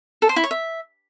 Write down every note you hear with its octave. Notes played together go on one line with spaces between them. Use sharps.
A4
C5
E4
C#5
E5